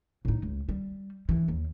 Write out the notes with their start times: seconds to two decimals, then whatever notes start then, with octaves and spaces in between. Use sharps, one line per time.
0.25 A2 D#4
0.43 C#2
0.69 G3
1.29 E3
1.48 D#2